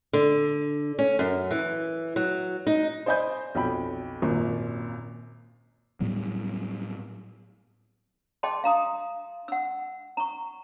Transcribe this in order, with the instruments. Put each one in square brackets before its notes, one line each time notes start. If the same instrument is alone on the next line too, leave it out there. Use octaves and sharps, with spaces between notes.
[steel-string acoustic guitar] D3
C#4
F#2
E3
F#3
D#4
[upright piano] C5 D5 D#5 G#5 B5 G6
B1 F2 G5 B5
G#1 F#2 A#2
[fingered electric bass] A2 F#3 G3 B3
[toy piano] G#4 D#5 G5 A5 C6
F5 A#5 D#6
F#5 E6
A#5 C#6